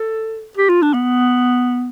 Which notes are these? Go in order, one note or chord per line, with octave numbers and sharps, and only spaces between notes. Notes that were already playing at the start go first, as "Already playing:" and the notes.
Already playing: A4
G4
F4
D4
B3